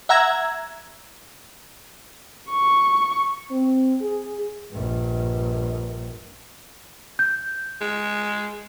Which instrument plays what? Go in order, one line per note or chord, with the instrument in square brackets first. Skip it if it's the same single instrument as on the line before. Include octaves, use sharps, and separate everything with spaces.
[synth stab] E5 F#5 A#5 E6 G#6
[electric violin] C#6
[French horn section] C4
G#4
[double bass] A#1 G2
[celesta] G6
[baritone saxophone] G#3